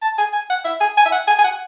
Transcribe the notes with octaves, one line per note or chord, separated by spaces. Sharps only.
A5
G#5
G#5
F#5
E5
G#5
G#5
E5
F#5
G#5
G#5
F#5